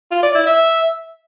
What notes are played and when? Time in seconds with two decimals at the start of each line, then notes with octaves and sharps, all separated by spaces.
0.11 F4
0.23 D5
0.35 E4
0.46 E5